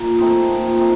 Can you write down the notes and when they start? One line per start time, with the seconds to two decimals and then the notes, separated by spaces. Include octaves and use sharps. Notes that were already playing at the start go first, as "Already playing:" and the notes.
Already playing: A#2
0.18 A3 C4 D#4
0.48 A#2
0.79 A3 C4 D#4